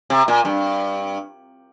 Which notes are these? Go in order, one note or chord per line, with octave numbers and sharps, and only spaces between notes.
C3
A#2
G2